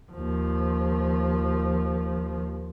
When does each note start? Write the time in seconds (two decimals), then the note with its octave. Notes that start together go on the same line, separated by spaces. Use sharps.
0.12 D#2 F3